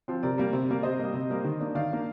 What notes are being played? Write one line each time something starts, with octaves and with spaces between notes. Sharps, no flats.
F3 C4
C3 A#4 D5
G3 A#3
C3
G3 A#3
C3 C5 D#5
G3 A#3
C3
G3 A#3
D#3
A#3 D4
D#3 D5 F5
A#3 D4